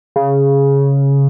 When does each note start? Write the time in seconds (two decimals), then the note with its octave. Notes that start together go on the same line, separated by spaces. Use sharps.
0.16 C#3